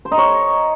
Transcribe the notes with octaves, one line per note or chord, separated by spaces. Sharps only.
C5
D#4
C#5